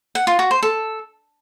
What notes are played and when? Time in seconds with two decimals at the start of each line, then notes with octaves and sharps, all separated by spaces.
0.15 F#5
0.27 F4
0.39 F#4
0.51 C5
0.63 A4